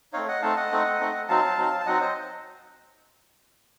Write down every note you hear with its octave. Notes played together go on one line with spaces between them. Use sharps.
A3 C4 D#4 C#5 F5
D#5 F#5
A3 C4 D#4 F5 A5
D#5 F#5
A3 C4 D#4
A3 C4 D#4
F#3 C4 D#4 F5 A5
F#3 C4 D#4
A5
F#3 C4 D#4 D#5 F#5
C5 D#5